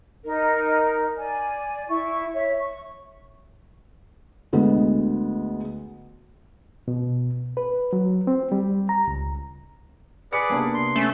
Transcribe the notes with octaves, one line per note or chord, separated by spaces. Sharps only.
D#4 A#4
D5 G#5
E4 C#6
C#5 E5
C#6
D2 G#3 B3
B2
B4
F#3
C4
G3
A#5
C#2
G#4 B4 D5 C#7
C3 A#3 B3 D4
C6
A3 C#4